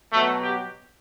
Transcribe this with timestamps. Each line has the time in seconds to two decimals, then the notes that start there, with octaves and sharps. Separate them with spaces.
0.12 B2 F#3 A3
0.42 G4